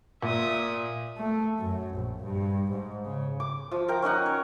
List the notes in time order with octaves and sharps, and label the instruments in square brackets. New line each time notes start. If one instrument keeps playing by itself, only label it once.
[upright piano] A#2 [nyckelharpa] E5 D#6
[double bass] A3
F#2
A#1
G2
G#2
C#3
[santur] D6
F3
A#4 G5 A#5
C#4 D#4 D#5 F#5
C#5